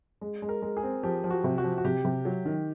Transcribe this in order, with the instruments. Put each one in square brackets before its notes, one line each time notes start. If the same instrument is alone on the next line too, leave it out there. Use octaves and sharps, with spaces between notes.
[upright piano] G#3
G#3
[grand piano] A#4
[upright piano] G#3
[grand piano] G#4
[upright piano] C4
[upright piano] F3 [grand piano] G4
[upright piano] F3
[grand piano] F#4
[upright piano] C3
[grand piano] F#4
[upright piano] F3
[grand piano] F#4
[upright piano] C3 [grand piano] G4
[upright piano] C3
F#3
D#3